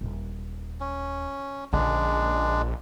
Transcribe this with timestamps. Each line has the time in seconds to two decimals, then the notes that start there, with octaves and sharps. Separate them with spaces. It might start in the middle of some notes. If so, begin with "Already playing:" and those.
0.01 D#1
0.80 C#4
1.73 A#1 D3 G#3 C#4 D4